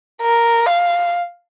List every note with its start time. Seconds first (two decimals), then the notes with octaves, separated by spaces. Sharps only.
0.22 A#4
0.66 F5